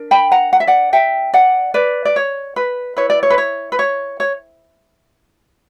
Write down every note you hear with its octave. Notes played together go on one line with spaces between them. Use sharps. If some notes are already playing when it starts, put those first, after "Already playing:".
Already playing: D4 A#4
G5 B5
F#5 A#5
F#5
E5
D5 F#5
E5 G5
D5 F#5
B4 D5
D5
C#5
B4
E4 B4 C#5
D5
C#5
B4
C#5
B4
C#5
C#5